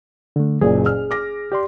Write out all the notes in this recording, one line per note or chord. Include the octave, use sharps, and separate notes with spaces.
D3 A3
F#1 A#2 G#4
F6
D6 A#6
G4 D5 C6